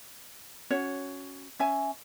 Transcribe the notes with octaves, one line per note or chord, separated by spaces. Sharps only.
C#4 F#4 C#5
C#4 E5 G#5